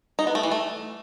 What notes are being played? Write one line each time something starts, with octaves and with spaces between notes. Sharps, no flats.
D#4
B3
A3
E3
A3